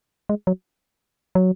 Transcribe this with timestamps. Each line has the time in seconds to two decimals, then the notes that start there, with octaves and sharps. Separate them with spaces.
0.29 G#3
0.47 F#3
1.35 F#3